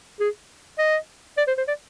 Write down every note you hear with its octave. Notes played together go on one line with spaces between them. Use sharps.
G#4
D#5
D5
C5
C5
D5